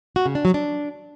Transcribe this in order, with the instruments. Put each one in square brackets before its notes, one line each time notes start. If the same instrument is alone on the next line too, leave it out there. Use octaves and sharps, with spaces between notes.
[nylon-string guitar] F#4
C#3
D4
F#3
D4